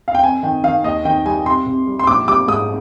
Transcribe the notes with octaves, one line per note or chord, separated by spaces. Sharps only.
F5
G5
F2 G#5
D#3 G5
D#3 F5
D#2 D#5
D#3 G5
G3 G#5
C3 C6
C3
G3
C6
A#1 D6
G3 D6
G#2 D#6